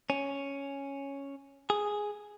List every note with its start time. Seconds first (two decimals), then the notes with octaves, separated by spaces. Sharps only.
0.10 C#4
1.70 G#4